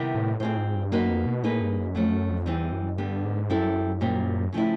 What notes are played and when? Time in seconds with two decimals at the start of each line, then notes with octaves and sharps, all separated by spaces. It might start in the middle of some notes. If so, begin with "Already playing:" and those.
Already playing: C3 D#3 G3 B3 E4
0.15 A2
0.40 A2 C4 F4 G#4 C5
0.57 G#2
0.75 G2
0.92 F#2 A#3 D#4 F#4 B4
1.10 F2
1.26 B2
1.43 A2 A#3 D#4 G#4 B4
1.61 G2
1.78 F#2
1.95 F2 F#3 A3 C#4
2.12 F#2
2.29 F2
2.46 E2 E3 G3 C4 D#4
2.72 F#2
2.98 G2 D3 G3 B3
3.24 G#2
3.49 F#2 G3 C4 E4 A4
4.01 A#2 G3 C4
4.53 C#3 F3 A3 C4 E4